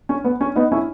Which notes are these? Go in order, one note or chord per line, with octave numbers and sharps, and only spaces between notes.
C#4
B3
C#4
B3 D#4
C#4 E4